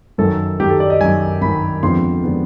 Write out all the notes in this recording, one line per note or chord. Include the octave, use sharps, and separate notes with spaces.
F#2 D#3 F#3 A4
F#2 D#3 F#3 G4
A4
D5
D#5
F#2 D#3 F#3 G#5
F#2 D#3 F#3 B5
F2 D3 F3 G#3 B3 C6
D3 F3 G#3 B3